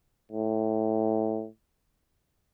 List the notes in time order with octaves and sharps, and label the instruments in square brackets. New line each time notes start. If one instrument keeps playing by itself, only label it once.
[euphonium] A2